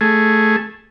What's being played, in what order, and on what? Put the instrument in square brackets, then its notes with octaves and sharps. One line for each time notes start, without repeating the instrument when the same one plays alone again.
[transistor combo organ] A3 G#4